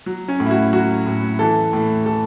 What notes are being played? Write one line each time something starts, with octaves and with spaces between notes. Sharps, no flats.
F#3
C#4
A2
E4
F#4
F#3 F#4
A2
E3 A4
A2
E3 A4